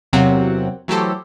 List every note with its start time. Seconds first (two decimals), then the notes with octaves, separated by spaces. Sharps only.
0.13 E2 C3 F#3 A#3 C4 F#5
0.88 E3 F#3 A3 G4 A4 C5